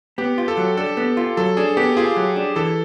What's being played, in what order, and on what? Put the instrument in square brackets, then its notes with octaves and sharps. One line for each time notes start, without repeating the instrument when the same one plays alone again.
[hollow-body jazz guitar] B3 [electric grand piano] G4
[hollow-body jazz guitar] F4
[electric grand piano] A4
[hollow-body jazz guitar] F#3
[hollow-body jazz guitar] D4 [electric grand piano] A4
[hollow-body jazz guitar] B3
F4
[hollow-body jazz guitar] F#3 [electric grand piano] A4
[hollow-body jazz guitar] D4 [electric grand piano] G#4
[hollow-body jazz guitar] B3 [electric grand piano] G4
[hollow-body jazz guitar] F4 [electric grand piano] G#4
[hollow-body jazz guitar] F#3
D4
[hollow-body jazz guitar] E3 [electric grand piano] A4